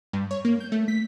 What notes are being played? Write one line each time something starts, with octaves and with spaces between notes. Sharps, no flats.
G2
C#5
A#3
G6
A3
B6